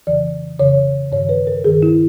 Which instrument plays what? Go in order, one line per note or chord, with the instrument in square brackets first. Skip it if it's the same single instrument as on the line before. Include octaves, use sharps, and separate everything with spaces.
[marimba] F2 C#3 E3 D5
F2 C#3 E3 C#5
G2 D#3 C#5
B4
A#4
G2 D#3 G#4
E4